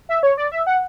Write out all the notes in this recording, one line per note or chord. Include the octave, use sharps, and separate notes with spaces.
E5
C#5
D5
E5
F#5